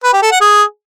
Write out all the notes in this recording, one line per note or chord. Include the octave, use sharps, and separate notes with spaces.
B4
G4
A4
F#5
G#4